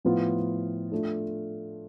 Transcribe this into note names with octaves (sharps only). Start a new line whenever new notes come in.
A2 F3 B3 F4 B4
A3 D4 F4 A4